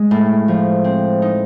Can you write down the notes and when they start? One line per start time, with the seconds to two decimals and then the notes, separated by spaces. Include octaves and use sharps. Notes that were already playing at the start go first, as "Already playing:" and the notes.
Already playing: G#3
0.11 A2
0.48 F3
0.84 C4
1.22 D#4